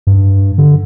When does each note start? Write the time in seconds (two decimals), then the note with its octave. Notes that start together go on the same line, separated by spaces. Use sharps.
0.07 G2
0.58 D3